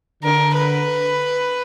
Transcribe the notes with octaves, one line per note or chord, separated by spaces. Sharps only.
D3 A#4
B4